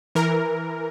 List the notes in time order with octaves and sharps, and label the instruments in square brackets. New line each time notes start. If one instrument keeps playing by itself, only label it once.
[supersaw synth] E3 A#4